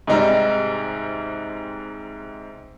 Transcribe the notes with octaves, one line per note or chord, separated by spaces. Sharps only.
G#2 C3 G3 D#4